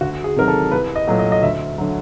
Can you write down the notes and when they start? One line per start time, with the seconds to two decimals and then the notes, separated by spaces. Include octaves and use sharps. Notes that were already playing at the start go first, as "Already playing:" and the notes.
0.01 D2 F#4
0.24 G#4
0.36 C3 D#3 F#3 A#4
0.48 A4
0.71 C2 B4
0.96 D#5
1.08 A#2 F#3 A3
1.19 D#5
1.32 D#5
1.43 D2 E5
1.78 D3 F#3